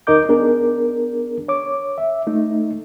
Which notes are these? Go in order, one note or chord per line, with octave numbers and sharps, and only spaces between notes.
D#2 D#4 A#4 D#5 D6 G6
B3 D4 G#4 A#4
C#5 D6
E5
A3 D#4